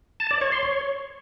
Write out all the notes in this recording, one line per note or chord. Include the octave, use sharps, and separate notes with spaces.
A5
D5
C#5
C6
C#5